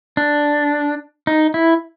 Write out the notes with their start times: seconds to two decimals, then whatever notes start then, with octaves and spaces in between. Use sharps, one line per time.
0.17 D4
1.27 D#4
1.54 E4